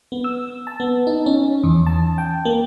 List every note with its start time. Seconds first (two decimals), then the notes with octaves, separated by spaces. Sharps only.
0.12 B3
0.24 E6
0.67 A5
0.80 B3
1.07 D#4
1.26 C#4
1.64 E2
1.87 A5
2.18 G5
2.45 A#3